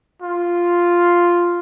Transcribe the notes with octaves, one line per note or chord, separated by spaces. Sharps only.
F4